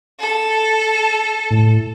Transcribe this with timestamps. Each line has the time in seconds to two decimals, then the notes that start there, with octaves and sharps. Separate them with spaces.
0.20 A4
1.51 A2